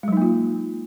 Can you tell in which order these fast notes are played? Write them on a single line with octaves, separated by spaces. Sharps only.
G#3 F#3 D#4 A#3 F4